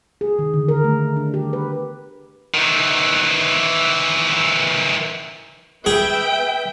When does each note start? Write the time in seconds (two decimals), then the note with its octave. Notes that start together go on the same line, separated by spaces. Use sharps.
0.21 G#4
0.39 D#3
0.54 D3
0.68 A#4
0.84 A3
1.17 D4
1.34 G4
1.53 B4
2.54 D#3 E3
5.86 G#4 B4 E5 G5